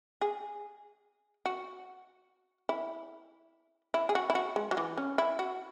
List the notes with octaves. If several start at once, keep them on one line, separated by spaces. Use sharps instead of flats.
G#4
F#4
E4
E4
G#4
F#4
E4
F#4
G#3
F#3
E3
C#4
E4
F#4